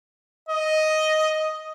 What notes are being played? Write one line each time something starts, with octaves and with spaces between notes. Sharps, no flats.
D#5